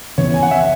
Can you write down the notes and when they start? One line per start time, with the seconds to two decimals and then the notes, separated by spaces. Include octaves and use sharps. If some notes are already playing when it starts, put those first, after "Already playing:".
0.18 C#3 E3 B3 C#5
0.34 G#5
0.43 F#5
0.51 E5